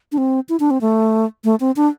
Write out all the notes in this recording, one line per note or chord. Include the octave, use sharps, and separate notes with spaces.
D4
C4
E4
D4
C4
A3
A3
C4
D4